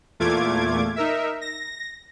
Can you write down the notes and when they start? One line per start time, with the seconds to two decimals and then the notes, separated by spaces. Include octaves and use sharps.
0.20 E2 A#2 A3 F4 D6 G#6
0.96 D#4 A#4 E5
1.41 A#6